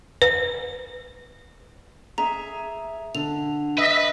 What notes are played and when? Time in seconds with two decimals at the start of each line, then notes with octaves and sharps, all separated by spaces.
0.22 B4
2.18 G#4 E5 A#5
3.15 D3 F7
3.78 B4 D#5 E5